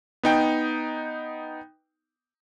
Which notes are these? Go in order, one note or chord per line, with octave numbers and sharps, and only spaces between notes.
B3 D#4 G5